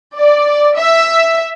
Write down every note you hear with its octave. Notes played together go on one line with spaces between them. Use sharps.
D5
E5